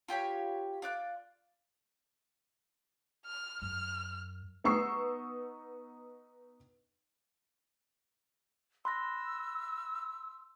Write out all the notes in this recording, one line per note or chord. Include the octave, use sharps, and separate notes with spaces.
F4 G4 C#5 B5
F4 D5 F#6
F6
F#2 F6
B3 D#4 C#6 E6 C7
B5 C6 E6 F#6 A#6